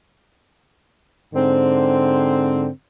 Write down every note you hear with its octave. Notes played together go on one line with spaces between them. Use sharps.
G#2 D3 C4